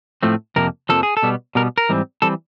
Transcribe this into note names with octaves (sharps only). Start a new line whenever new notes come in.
A2 F3 A3 C4
F2 C3 F3 A#3 A#4
F2 C3 F3 A#3 A4
G#4
A4
B2 G3 B3
B2 G3 B3 A#4
A#4
G#2 E3 G3 C4
E3 G3 C4 A4